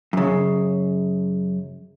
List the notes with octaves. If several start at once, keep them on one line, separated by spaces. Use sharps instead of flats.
F#2 C#3